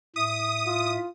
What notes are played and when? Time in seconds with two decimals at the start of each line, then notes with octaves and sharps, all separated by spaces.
0.16 A2 E5 D#6
0.66 F4